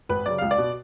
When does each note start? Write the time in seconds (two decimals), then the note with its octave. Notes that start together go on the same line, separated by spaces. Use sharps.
0.09 G#1 B4
0.26 F#2 C#3 D5
0.38 C#2 F5
0.51 D5
0.58 B2